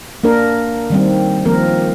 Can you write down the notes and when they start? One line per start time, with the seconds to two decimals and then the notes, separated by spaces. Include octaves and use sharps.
0.24 A#3 D4 A#4
0.90 D#3 G3 C4
1.45 D#3 F3 A#3 C4 A#4